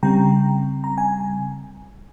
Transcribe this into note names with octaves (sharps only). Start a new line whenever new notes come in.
C#3 G3 C4 G5 A#5
A#5
G#5